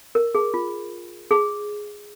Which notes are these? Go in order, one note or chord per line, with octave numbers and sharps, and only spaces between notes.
A#4
G#4
F4
G#4